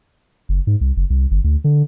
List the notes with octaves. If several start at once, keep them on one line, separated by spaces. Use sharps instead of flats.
F#1
G#2
C2
F#1
C2
G1
D2
D3